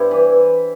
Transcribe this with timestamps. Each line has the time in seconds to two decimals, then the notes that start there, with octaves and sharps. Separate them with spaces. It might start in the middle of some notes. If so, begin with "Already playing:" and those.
Already playing: G2 E4 G4 C5
0.11 E3